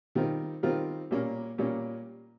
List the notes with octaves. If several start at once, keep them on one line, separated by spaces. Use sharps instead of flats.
D#3 G3 C4 F4 A#4
D#3 G3 C4 F4 A#4
A#2 G3 A#3 C#4
A#2 G3 A#3 C#4